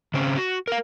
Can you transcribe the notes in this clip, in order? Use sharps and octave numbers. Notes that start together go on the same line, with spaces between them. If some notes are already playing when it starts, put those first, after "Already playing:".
C#3 C4 C#4
F#4
A#4 F5